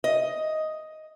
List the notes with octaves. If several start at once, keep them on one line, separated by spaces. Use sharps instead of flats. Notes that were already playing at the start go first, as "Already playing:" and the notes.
D#5